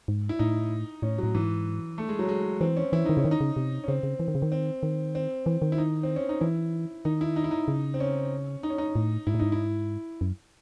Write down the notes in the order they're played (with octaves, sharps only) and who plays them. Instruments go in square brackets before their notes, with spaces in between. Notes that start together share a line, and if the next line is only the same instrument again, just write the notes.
[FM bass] G#2
[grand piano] E4
[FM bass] A2 [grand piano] D#4
[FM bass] A2 [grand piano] C#4
[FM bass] A2 [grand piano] F#3
[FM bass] G#2 [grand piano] E3
[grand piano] A3
G#3
F#3
G#3
[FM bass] E3 [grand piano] C4
[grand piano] C#4
[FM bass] E3 [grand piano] E4
[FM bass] D#3 [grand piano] D#4
[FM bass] C#3 [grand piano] C#4
[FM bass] D#3
[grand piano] D#4
[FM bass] C#3
C3
[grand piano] C#4
[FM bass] C#3 [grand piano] C4
[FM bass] C#3
E3
D#3
C#3
D#3
[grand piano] C4
[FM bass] D#3
[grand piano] C4
[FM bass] E3
D#3
[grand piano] E4
D#4
C4
C#4
D#4
[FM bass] E3 [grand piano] E4
[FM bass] D#3 [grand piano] D#4
[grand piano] E4
D#4
E4
D#4
[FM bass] C#3
[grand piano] C4
C#4
D#4
C#4
D#4
[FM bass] A2
[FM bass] G#2 [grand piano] E4
[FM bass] A2
[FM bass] G#2 [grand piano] D#4
[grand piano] E4
[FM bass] F#2